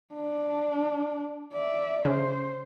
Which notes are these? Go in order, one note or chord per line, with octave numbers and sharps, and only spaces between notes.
D4
D5 E5
C#3 C5